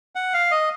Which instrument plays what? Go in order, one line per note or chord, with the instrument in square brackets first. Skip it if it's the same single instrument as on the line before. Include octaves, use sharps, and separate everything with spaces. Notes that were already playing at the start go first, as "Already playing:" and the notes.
[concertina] F#5
F5
D#5